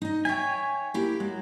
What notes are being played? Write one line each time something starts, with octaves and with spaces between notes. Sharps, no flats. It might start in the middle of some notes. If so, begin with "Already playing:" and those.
D#4 D#5
C#5 E5 G5 G#5
A#3 E4 G4
F#3 G#3